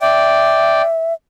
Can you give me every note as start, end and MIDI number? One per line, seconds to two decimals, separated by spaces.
0.01 0.82 74
0.01 1.13 76
0.01 0.82 79